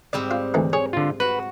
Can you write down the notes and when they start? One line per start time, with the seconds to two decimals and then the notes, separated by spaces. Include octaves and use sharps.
0.13 G#2 G3 C4 D5
0.31 F4
0.54 D2 E3 D#4
0.73 G#4 C#5
0.93 D3 F4
1.20 F#4 B4